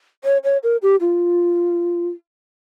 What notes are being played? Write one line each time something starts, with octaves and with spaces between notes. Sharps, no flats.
C#5
C#5
A#4
G4
F4